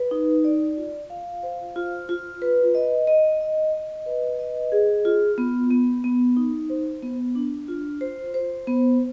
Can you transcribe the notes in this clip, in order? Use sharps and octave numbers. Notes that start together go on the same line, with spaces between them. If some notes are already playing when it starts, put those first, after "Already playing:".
Already playing: B4
D#4
D5
F4
F5
C5
F4
F4
B4
D#5
D#5
D#5
D#5
B4
D#5
G#4
F4
B3
B3
B3
D#4
C5
B3
D4
F4
C5
C5
B3